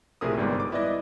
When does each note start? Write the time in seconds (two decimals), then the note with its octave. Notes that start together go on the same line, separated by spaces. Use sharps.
0.21 A#1 A2 C3 G#4 A#4 D#6
0.37 G1 G#2 G3 B3
0.60 D6
0.72 E4 B4 D5 D#5